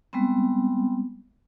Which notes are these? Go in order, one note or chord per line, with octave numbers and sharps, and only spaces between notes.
G3 G#3 B3 C4